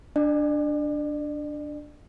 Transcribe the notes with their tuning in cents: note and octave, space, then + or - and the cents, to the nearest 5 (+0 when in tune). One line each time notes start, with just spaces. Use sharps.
D4 +0 D5 +40